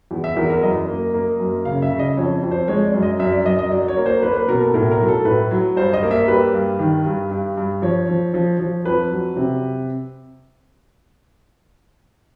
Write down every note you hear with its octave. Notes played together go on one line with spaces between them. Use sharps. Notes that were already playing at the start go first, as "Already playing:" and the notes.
E2
E5
E2 A#4
A#4
F#2 D#5
A#3
A#3
F#2
C#3 F5
E5
C#3
D#5
F2 C#5
F2
C5
G#3 C#5
D5
F#2
D#5
F#2 E5
D5
F#2 D#5
D#5
F#3 D5
C#5
A#3
C5
A#3 B4
B4
B2 A#4
A4
A2 A#4
A#4
F#3
A4
A2 B4
F#3
G2 C5
D#5
A#3
E5
G3 B4
G2
D#3
G2
G2
G2
F3 C#5
F3
F3
F3
F2 B4
F#3
C3